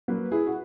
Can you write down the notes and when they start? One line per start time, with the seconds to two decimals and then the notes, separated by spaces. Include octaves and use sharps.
0.08 F#3 A#3 B4
0.32 E4 G#4
0.47 F#4